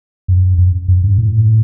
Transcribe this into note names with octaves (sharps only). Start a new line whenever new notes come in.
F#2
F#2
F#2
G2
A2